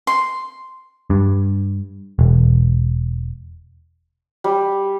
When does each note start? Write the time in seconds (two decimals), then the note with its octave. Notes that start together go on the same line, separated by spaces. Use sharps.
0.07 C6
1.10 G2
2.19 E1
4.44 G3